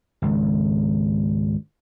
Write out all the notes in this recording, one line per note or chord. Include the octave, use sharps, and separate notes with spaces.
G#1 C#2